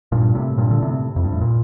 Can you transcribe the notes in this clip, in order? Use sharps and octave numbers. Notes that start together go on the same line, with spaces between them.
G2 A#2
A2 C3
G2 A#2
D3
A2 C3
F2
G2
A2
A#2